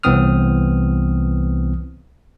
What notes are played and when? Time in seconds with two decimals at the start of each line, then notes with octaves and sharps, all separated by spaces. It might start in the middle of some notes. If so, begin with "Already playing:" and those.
0.03 C2 E3 B3 C4 D#6 F6